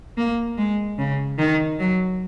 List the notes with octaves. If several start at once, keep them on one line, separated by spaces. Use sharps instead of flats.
A#3
G#3
C#3
D#3
F#3